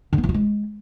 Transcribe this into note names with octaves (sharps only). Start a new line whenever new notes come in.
D3
B3
E3
F4
G#3